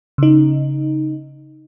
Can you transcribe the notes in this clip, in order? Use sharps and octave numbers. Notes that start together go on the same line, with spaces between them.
C#3 D#4